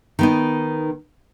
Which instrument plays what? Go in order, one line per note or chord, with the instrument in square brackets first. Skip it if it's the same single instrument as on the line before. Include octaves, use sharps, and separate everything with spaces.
[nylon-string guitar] D#3 B3 D#4